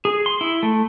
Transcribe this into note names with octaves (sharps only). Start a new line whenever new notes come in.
G#4
C6
E4
A3